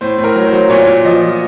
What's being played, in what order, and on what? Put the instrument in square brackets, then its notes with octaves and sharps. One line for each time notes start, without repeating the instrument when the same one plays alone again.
[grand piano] A2 C5
A2
A#4
F#3
C5
F#3
A#2 C#5
A#2
F3 D#5
F3